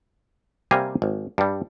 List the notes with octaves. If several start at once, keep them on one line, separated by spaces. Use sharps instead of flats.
C3 G3 A#3 F5 G#5 A#5
G#1
G2 G3